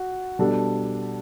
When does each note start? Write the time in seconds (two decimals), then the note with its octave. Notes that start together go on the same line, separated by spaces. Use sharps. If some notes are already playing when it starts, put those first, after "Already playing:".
Already playing: F#4
0.39 B2 G3 D4 A4